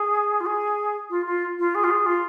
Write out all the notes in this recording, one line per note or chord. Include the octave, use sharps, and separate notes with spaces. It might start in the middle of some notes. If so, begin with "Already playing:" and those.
Already playing: G#4
F4
G#4
F4
F4
F4
G#4
F4
G#4
F4